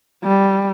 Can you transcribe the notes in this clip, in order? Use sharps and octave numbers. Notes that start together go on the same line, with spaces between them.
G3